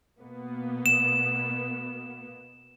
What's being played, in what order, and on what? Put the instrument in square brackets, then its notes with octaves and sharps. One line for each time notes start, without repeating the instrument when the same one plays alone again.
[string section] B2 A#3 B3
[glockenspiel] E7